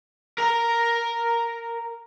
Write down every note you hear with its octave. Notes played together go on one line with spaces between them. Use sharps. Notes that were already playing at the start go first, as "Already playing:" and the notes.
A#4 A#5